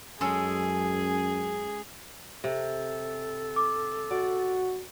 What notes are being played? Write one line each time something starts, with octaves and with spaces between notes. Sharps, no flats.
F#2 G#3 C#4 G#4 A4
C3 A4
D6
F#4 D5